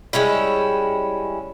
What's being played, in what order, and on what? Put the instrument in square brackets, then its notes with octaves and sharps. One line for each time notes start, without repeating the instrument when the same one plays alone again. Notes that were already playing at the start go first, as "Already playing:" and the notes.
[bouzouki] G3 G#3 C#4 E4